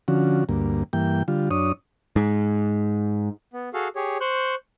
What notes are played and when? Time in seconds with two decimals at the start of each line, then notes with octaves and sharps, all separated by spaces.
0.08 D3 F3 C#4 F#4
0.49 D2 G2 A#3
0.93 G2 E3 A#3 G5
1.28 D3 G3 F4
1.51 F#2 D4 C#5 D#6
2.16 G#2
3.53 B3
3.74 F#4 G#4 A4 F5
3.95 G4 G#4 C#5
4.20 C5 C#6 F#6 G6